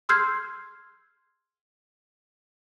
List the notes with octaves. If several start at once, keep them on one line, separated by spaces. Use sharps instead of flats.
C6 E6 F6 G6 G#6 C7